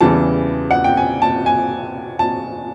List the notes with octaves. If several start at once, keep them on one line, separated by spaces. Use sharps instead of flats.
E2 C#3 E3 G3 A5
F#5
G5
G#5
A5
G#5
A5